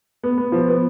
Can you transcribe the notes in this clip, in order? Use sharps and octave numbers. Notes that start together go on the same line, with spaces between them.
B3
B3
F3
B3